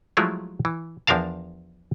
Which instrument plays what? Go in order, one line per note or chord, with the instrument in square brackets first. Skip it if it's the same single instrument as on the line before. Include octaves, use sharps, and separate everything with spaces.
[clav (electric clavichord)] F3 F#3 G#3 A3 E4 F4
E3
E2 F3 D4 A#4 F5 A5